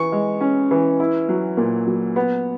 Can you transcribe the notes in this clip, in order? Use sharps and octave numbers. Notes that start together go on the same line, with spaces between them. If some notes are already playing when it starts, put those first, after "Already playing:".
Already playing: E3 C#6
G#3
C#4
E3
E4
F#3
A#2
F#3
B3